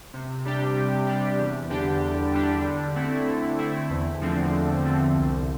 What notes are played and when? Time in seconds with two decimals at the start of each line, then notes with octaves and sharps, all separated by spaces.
0.14 C3
0.45 G3 D4 G4
0.77 C3
1.07 G3 D4 G4
1.39 E2
1.70 D3 G3 D4 G4
2.01 E2
2.33 D3 G3 D4 G4
2.64 D3
2.96 A3 C4 E4
3.27 D3
3.59 A3 C4 E4
3.90 E2
4.21 D3 F3 A3 C4
4.53 E2
4.84 D3 F3 A3 C4
5.15 C2